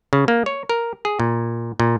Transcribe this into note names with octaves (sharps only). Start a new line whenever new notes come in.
C#3
A#3
C#5
A#4
G#4
A#2
A#2